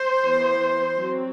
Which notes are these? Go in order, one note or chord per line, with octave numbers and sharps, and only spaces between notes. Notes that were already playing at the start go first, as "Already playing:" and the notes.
Already playing: C5
E3 B3
F#3 C4